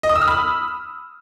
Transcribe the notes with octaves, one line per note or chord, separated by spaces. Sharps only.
D#5
D#6
E6
F6
B5